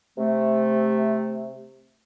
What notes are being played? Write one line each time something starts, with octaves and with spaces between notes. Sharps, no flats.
C3 A3